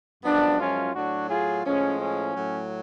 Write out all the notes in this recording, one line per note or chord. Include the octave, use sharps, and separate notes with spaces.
F#2 F3 G#3 B3 D4
C#4 F4
A2 F#3 D4 F#4
F4 G#4
A2 F3 G#3 C#4
C#4
A2 F#3